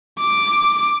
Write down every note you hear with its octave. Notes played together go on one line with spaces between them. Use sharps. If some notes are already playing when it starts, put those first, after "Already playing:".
D6